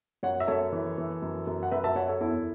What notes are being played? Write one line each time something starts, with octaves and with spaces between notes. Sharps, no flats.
F#2 C#5 F#5
E5
F#2 A4 C#5
E3
E3
F#2
F#2
F#5
F#2 B4 E5
E5 A5
F#2 C#5 F#5
A4 C#5
E2 E4 A4